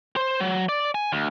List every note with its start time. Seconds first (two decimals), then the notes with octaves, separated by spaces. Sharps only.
0.16 C5
0.40 F#3
0.69 D5
0.95 G#5
1.12 D2